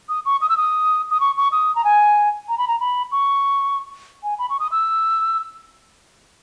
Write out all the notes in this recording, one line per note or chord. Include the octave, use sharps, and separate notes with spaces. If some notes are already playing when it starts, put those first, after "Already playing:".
D#6
C#6
D#6
E6
D#6
D#6
C#6
C#6
D#6
A#5
G#5
A#5
B5
A#5
B5
C#6
G#5
B5
C#6
D#6
E6